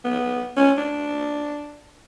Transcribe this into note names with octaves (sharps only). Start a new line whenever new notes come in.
B3
C#4
D4